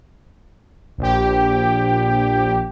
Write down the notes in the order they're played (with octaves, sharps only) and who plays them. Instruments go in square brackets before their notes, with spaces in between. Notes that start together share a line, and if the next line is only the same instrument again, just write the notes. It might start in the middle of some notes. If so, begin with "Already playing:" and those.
[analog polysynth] A#1 G4